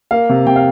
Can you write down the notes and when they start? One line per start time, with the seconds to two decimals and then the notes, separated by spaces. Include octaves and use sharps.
0.11 A#3 F5
0.29 C3
0.46 C3 G5
0.56 F5